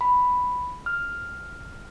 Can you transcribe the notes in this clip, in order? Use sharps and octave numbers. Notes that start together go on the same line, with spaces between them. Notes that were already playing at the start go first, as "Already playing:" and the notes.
B5
F6